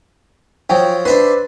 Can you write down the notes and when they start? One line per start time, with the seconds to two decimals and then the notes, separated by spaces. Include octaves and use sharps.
0.69 F3 F#3 G5
1.05 D4 B4 C5 E5 C6